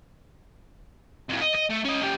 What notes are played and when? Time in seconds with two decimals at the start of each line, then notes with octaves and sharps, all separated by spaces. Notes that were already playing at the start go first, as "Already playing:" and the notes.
1.29 F2 A2
1.41 D#5
1.55 D#5
1.70 A3
1.85 C#4 D#5
2.02 C#4 G4